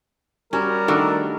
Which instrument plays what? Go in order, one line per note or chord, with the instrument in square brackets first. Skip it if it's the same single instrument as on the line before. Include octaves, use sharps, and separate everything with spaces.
[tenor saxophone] G3 [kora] C#4 [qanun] F#4 [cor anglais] A#4
[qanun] D#3 A3 [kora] D4 F#4 A4